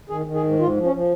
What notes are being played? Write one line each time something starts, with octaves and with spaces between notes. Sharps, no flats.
D#3 G#4
D#3
G#4
G#2
G#2 F4
F3
C#4
F3